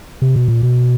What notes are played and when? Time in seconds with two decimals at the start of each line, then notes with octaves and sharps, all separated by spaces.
0.22 C3
0.36 B2
0.48 A#2
0.63 B2